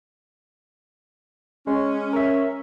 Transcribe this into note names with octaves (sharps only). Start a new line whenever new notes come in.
G#3 C#4
A#4 E5